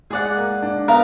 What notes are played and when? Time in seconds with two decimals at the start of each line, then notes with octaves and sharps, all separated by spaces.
0.10 G#3 G#4 D5 F#5
0.37 A#3
0.63 D4
0.88 B3 A#4 F5